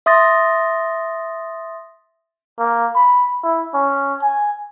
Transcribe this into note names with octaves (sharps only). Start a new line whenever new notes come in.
E5 C6 D#6 A6 A#6
A#3
B5
E4
C#4
G#5